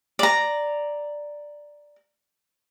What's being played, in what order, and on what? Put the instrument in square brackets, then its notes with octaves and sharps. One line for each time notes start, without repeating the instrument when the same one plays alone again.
[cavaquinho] D5 A#5